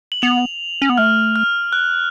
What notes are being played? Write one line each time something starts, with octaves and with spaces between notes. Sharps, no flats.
F#7
B3 F7
C#4
B3
A3 F6
F6
F#6